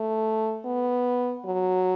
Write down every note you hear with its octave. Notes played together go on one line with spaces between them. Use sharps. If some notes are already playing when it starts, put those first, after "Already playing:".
Already playing: A3
B3
F#3